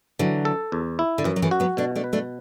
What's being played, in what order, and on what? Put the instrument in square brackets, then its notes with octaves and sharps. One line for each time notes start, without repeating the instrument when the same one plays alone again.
[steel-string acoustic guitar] D3 F#3 [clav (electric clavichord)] E3
[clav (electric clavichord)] A4
E2
E4
[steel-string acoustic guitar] D3
[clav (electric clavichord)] F#2 [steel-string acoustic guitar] E3
[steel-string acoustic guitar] F#3
E3 A3
[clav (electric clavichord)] F#4
[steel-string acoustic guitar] F#3 B3
[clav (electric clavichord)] B2 [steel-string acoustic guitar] A3 D4
[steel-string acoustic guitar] A3 D4
[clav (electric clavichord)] B4
[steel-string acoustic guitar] A3 D4